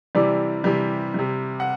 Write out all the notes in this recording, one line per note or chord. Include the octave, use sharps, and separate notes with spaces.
C3 E3 G3 D5
C3 E3 G3
C3 G3
F#5